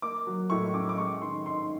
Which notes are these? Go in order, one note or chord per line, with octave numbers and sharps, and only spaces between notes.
A#3 D6
F#3
A2 C#6
C#4 D6
D6
G#3 C#6
D#3 C6
G#2 C6